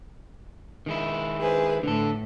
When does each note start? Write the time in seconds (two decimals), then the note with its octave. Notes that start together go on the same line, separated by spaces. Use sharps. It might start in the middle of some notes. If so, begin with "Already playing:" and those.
0.86 D#3 G#3 E4
1.40 G#4 B4 C5
1.83 A2 D3 A4